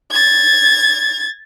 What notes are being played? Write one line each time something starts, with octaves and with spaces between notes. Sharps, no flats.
G#6 A6